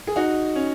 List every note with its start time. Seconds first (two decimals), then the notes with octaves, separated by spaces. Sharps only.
0.07 G#4
0.16 D#4 F#4
0.56 C#4